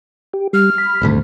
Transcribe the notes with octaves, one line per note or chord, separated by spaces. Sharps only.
G4
G3 F6
B5
D#1 G#1 D2